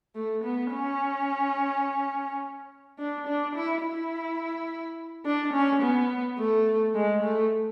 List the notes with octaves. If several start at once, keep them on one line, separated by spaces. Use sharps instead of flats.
A3
B3
C#4
D4
D4
E4
E4
D4
C#4
B3
A3
G#3
A3